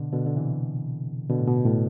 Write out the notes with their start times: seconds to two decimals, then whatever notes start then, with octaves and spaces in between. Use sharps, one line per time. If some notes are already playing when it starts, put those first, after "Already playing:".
Already playing: B2 D3
0.13 B2 D3
0.26 D3
0.36 C3 E3
1.30 B2 D3
1.39 A2
1.47 B2
1.65 A2